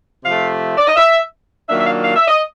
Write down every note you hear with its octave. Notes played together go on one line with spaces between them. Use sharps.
C3 F3 A3 F5
D5
D#5
E5
D#3 F#3 A#3 D4 F4 E5
E5
F5
F5
E5
D#5